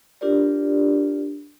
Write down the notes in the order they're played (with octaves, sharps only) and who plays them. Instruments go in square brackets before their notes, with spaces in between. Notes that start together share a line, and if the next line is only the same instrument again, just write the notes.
[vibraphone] D4 F4 G4 A#4 D5